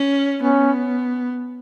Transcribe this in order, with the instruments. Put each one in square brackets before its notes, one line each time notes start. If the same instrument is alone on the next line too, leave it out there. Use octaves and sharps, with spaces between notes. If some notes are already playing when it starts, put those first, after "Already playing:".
Already playing: [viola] C#4
[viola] B3 [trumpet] C#4